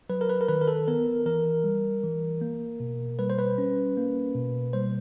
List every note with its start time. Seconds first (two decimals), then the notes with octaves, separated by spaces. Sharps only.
0.09 F#3 B4
0.21 A#4
0.29 B4
0.41 A#4
0.49 D#3 B4
0.61 A#4
0.68 A4
0.88 B3 A#4
1.26 E3 A#4
1.64 G3
2.03 E3
2.41 A#3
2.80 B2
3.19 G3 B4
3.30 C5
3.39 B4
3.58 C#4
3.97 A#3
4.35 B2
4.73 G3 C5